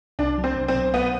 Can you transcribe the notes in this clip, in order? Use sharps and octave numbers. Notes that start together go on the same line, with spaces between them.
C2 D4
F#3
C4
C2
C4
B2
C2 B3